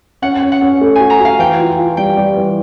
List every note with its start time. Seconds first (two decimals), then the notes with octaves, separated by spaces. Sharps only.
0.22 C#4 F#5
0.42 C#4
0.52 F#5
0.62 C#4
0.81 A3
0.95 F#4 G#5
1.10 A#5
1.20 F#4 F5
1.39 E3 G5
1.59 F4
1.78 F4
1.97 G3 G5
2.17 G3
2.37 E3